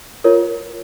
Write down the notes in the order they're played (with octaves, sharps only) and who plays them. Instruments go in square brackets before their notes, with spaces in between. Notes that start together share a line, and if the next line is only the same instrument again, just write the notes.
[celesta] F4 A#4 C#5